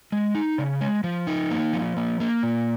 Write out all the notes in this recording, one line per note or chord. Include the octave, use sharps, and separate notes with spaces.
G#3
D#4
C#3
G#3
F3
D#4
A#3
F3
A#3
A#3
A#2